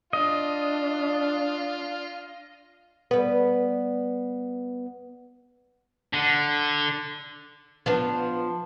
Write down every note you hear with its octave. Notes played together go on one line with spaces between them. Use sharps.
D4 F4 D#5
G3 B3 B4
D3
F3 B3 D4